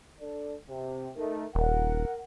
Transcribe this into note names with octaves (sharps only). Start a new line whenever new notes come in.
D4 A4 D5
C3
A3 D#4 A#4
D#1 A#4 F#5